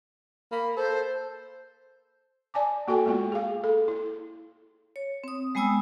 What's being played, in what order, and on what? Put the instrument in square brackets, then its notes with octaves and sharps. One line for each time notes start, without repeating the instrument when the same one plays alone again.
[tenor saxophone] A#3 [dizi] B5
[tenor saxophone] A4 [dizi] C5
[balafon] D5 G#5 A5 D6
A#3 F#4 A4 G5 G#5
G#3 A#3 B3 F4 F#4
G#4 F5
A4
E4
[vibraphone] C#5
C4 D#6
G3 G#3 B3 G#5 D#6 E6